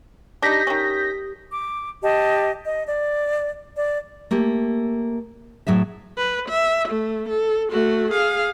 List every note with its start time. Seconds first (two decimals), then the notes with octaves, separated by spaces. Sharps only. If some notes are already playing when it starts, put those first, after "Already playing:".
0.42 D4 D#4 G4 D#6 G6 A#6 B6
0.67 D#3 C#4
1.51 D6
2.03 G4 D#5 A5
2.66 D#5
2.88 D5
3.77 D5
4.31 A3 A#3 G4
5.67 A2 F#3 G#4 E5
6.18 B4
6.49 E5
6.89 A3
7.29 A4
7.72 A3 F#4
8.11 G#4 F5